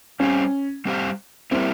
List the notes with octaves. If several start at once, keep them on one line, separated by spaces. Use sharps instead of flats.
G3 C4 C#4 G4 C5 F5
G3 C4 G4 C5 F5
G3 A#3 C4 E4